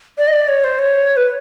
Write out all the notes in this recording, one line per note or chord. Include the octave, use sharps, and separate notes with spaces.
D5
D#5
D5
C#5
C5
C#5
B4